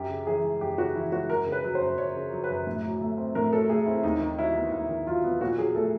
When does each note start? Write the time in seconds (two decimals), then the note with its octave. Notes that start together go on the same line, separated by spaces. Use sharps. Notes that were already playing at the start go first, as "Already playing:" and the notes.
Already playing: F#2 G4
0.09 C#3
0.27 E3 G#4
0.44 G#3
0.61 F#2 G4
0.78 C#3 F#4
0.95 E3 E4
1.12 G#3 F#4
1.30 F#2 A#4
1.46 C#3
1.52 B4
1.64 F#3
1.75 C5
1.81 F#2
1.98 F#2 C#5
2.15 C#3
2.32 F#3
2.44 B4
2.50 F#2
2.67 A2
2.84 F#3
3.02 A3
3.18 C4
3.35 A2 A#4
3.53 F#3 A4
3.69 A3 G#4
3.86 C4 E4
4.03 D#2 D#4
4.20 D#3
4.38 F#3 E4
4.55 B3
4.72 D#2 E4
4.89 D#3
5.07 F#3 F4
5.24 B3
5.41 A#2 F#4
5.58 F#3 G#4
5.75 A3 A4